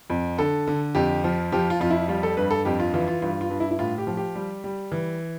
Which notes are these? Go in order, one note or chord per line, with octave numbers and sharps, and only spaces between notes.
F2
D3 A4
D3
F2 G4
F3
F3 G4
F4
F2 F4
E4
G3 F4
A4
G2 B4
A4
F2 G4
F4
E3 F4
F4
G2 F4
F4
G2
E4
E4
A2 F4
G4
F3
G4
G3
G3
E3